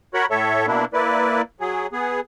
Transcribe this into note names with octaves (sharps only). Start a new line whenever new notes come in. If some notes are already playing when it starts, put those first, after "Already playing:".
F#4 A#4 C#5 F#5 B5
A2 A4 C#5 E5
B2 A#3 D4 E4
A#3 E4 B4 D5
F#3 G#4
B3 G#4